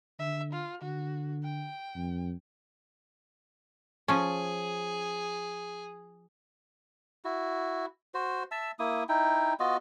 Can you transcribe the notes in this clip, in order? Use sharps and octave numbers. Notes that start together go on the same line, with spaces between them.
D3 E5
F4
D3 F#4
G5
F2
F3 C#4 G#4
E4 F#4
F#4 C5
E5 A5 E6
A#3 E4 D#6
D#4 E4 G5
B3 F4 F#4 D#5